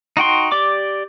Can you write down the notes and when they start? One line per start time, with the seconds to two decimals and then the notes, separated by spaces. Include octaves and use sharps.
0.17 D#4 F#4 G5 C6
0.52 G4 D5 D6